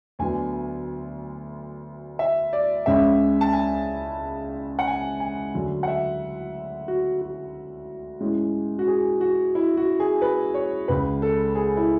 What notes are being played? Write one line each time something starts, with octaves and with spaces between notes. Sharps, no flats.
D2 D3 F#3 B3 G#5
E5
D5
C#2 C#3 G#3 C#4 E5
A5
G#5
F#5
G#5
G#5
D2 D3 F#3
F#5
E5
F#4
F#4
A2 G#3 C#4
F#4
G#4
F#4
E4
F#4
G#4
B4
C#5
C#2 C#3 G#3 B4
A4
G#4
E4